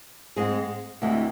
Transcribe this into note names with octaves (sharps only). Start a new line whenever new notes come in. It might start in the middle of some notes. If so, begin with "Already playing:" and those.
G#2 G#3 C4 G#4
D2 C3 E3 G#3